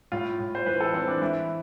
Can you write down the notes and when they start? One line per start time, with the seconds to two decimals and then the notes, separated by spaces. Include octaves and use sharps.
0.12 A2 F4
0.40 A2
0.55 C5
0.66 E3 B4
0.80 A4
0.94 E3 C4
1.08 D4
1.21 E3 E4